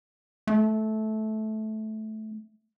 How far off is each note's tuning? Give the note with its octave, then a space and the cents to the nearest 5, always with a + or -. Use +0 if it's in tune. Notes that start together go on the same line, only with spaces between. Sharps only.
A3 -15